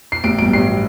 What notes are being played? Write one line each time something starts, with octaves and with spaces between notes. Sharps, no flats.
C7
A1 D7
G2 F#3 D7
A1 C7
F#3